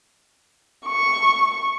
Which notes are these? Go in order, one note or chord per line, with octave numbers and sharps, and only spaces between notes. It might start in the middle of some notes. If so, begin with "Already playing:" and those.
C#6